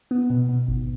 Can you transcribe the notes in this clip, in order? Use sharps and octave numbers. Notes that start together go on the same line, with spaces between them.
B3
B2
B2
G#1